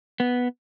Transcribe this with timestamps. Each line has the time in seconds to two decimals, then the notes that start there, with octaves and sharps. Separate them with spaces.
0.20 B3